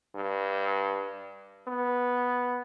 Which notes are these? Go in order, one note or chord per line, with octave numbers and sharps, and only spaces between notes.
G2
B3